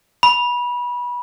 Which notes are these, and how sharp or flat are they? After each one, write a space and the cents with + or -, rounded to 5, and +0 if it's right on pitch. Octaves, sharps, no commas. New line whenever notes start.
B5 -25